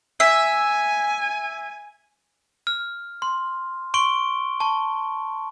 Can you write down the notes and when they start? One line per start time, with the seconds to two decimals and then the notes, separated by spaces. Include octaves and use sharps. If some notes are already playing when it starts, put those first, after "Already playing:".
0.20 E5 G#5
2.67 F6
3.22 C6
3.94 C6 C#6 D7 G7
4.60 A5 C#6